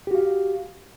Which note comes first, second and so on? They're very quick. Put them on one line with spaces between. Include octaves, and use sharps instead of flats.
G4 F#4 F5